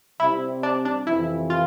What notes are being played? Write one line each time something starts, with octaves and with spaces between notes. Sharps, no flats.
C3 G3 C4 E4
D4
D4
F2 C3 E3 E4
F4